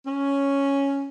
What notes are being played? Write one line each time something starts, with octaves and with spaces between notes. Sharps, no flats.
C#4